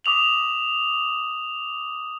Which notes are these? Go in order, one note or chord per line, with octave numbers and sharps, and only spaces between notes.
D6 D#6 F7 F#7